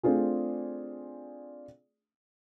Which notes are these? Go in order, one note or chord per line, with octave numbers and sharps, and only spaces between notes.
A3 C4 D4 F4 G#4